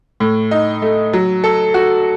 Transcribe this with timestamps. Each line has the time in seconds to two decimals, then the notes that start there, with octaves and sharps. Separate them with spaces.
0.20 A2
0.51 D#4
0.82 A3
1.13 F#3
1.44 A4
1.74 F#4